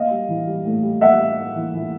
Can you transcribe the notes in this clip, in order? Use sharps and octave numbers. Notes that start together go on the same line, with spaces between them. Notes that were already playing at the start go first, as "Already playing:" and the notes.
Already playing: A#3 D#5 F5
G3
E3
G3
A2
G3
G3 E5 F#5
A#3
A#3
E3
E3